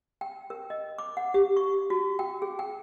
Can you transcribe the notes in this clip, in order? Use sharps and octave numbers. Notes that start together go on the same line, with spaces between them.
G5
A#4
D#5
D6
F#5
G4
C#6
F#4
G5
G#4
G5